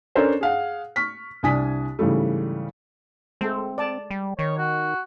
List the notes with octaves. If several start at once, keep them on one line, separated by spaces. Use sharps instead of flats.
C#4 D4 A4 A#4 C5 C#5
G#4 F5 F#5
C#6 F6 B6
C2 D4 G#5 D#6 B6
G#2 C#3 E3 G3 A3
G#3 A3 C4 A4
D5 A5
G3
D#3 C#5
F#4